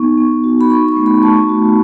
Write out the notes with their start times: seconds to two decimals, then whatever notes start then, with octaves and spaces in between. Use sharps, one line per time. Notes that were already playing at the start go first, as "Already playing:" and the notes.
Already playing: B3 D#4 C#6
0.18 B3
0.44 F#4
0.61 B5
0.70 D#4 C#6
0.88 C#6
0.97 A3
1.06 B5
1.23 A3 A5
1.49 F#4